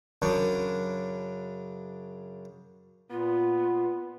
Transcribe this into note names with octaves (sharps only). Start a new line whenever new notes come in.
F#2 C#3 D4
A#2 B3 F4